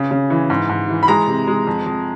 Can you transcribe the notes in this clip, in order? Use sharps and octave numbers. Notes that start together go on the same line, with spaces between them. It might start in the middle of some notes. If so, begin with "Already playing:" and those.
Already playing: C#3
C#3
E3
G#2
G#2
E3
B5
G#3 A#5
C3
G#3
F2
F2